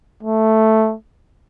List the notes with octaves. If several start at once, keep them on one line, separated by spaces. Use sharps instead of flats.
A3